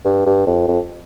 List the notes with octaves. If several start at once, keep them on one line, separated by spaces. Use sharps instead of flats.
G2
G2
F2
F2